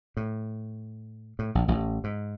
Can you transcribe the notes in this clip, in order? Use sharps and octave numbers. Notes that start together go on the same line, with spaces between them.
A2
A2
A#1
A1
G#2